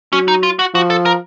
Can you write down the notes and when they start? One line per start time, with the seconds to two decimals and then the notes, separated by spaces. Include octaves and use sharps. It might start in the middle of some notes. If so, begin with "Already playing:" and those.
0.13 F#3 C#4
0.28 D#4
0.43 F4
0.59 F#4
0.74 F3 F#4
0.90 A4
1.05 A#4